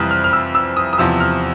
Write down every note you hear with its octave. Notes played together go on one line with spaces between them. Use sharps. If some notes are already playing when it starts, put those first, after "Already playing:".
Already playing: F2 C3 E3 G3 D#6 F6 F#6
F6
F6
E6
E6
D#6
D#6
E2 C3 F3 E6
F6